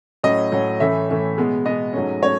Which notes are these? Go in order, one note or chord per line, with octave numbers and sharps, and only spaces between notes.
A2 F#3 C#4 D#5
A2 F#3 C#4
A2 E3 A3 C#4 E5
A2 E3 A3 C#4
B2 G#3 B3
B2 G#3 B3 D#5
G#2 F#3 A3 C#4
F#3 A3 C#4 C#5